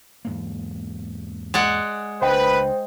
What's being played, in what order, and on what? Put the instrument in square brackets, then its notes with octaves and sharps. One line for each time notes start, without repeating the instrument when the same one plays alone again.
[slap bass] E2 G#2 A#3
[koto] G#3 D5 F#5
[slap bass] C#2 D4 [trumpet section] B4 [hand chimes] C5 D#5 G5